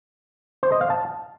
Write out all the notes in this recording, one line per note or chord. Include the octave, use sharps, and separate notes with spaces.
C5
D#5
F5
A5